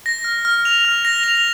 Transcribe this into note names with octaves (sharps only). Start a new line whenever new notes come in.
A#6
F6
F6
F7
F6
A#6
F7